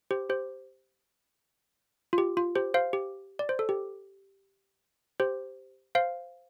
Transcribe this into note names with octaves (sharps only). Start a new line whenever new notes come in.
G4 C5
G4 C5
F4
G4
F4
G4 C5
C5 F5
G4
D5
C5
A4
G4
G4 C5
C5 F5